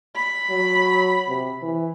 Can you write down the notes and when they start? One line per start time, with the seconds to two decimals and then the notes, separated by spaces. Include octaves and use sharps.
0.16 B5
0.50 F#3
1.28 C3
1.62 E3